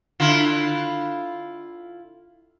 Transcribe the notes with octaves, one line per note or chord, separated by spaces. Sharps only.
D3 E4 F4